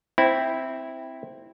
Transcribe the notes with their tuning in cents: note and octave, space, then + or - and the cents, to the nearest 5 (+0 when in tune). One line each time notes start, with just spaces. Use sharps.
C4 +0 E4 -5